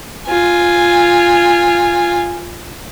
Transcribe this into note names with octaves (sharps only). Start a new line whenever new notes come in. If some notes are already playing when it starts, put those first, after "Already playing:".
F4 G#5